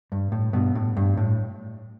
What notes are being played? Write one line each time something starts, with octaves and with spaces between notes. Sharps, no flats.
G2
A2
G2 B2
A2
G2
A2